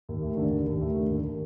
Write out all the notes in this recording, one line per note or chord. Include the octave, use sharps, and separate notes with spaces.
D#2
A3
D3
D#2
D#2
A3
D3
D#2